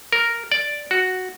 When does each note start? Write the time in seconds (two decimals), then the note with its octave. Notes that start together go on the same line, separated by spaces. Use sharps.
0.12 A#4
0.52 D5
0.91 F#4